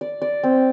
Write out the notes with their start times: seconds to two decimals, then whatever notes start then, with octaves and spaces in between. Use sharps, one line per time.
0.01 D5
0.22 D5
0.43 C4